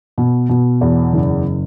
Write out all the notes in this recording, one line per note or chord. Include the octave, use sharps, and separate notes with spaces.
B2
B2
E2
F#1